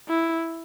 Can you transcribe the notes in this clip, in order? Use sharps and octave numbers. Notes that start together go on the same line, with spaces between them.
E4